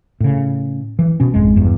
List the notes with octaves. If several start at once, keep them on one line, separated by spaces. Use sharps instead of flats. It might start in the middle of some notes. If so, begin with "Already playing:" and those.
A2 C#3
E3
B2 C#4
G#1 F2 G#3
E2 G2